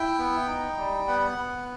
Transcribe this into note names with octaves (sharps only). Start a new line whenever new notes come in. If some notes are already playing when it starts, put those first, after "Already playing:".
Already playing: E4 G5
B3
D#4
G3
B3 F#5
B3